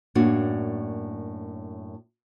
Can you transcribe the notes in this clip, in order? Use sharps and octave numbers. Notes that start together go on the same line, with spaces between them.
F#2 A2 A#3 D4 F#4